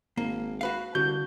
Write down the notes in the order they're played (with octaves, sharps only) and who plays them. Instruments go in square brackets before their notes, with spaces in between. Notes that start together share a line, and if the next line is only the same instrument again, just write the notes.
[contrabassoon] G#1 [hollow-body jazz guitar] A#3
[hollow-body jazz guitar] F#4 B4 F5
[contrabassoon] C2 [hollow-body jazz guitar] D3 [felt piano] F#4 [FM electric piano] G6